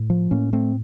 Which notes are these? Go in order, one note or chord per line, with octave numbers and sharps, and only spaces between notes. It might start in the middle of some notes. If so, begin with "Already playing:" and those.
Already playing: A2
F3
A2 A#3 C#4
A3 C4